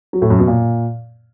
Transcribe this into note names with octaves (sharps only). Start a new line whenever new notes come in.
F#3
A2
F#2
B2
A#2